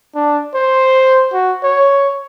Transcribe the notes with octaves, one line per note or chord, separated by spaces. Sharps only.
D4
C5
F#4
C#5